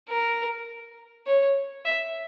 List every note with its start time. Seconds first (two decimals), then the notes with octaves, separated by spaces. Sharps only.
0.09 A#4
1.26 C#5
1.85 E5